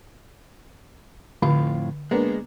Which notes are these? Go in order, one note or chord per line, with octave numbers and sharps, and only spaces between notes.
F2 A2 D3 F4
G#3 A#3 B3 D4